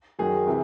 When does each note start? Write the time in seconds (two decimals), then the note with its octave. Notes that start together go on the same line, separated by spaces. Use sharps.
0.19 F#2 D#3 F#3 G#4
0.47 C3 E3